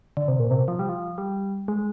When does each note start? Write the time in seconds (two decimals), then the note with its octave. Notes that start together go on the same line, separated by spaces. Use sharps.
0.17 D3
0.28 C3
0.40 A#2
0.51 C3
0.68 F3
0.79 G3
0.89 F3
1.18 G3
1.68 G#3